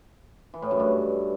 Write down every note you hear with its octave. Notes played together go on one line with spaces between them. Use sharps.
E3
A2
F#2
G2